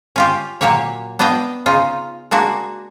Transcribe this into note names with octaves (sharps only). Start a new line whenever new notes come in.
C#4 F4 G4
A#2 F#3 A#3 G4 C#5
B3 D4 D#5 F5 G5
C#3 D#4 F4
G#3 A#3 D4 F#4